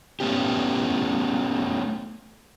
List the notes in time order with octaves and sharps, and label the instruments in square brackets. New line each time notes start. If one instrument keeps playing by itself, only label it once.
[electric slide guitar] A3 B3 C#4 G4